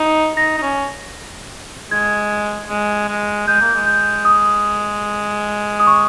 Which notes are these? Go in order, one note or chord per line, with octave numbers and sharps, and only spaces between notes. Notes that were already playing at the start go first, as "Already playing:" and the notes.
Already playing: D#4
D#4 A#6
D#4
C#4
G#3 G#6
G#3
G#3
G#3 G6
A#3
G#3
G6
D#6
D#6
C#6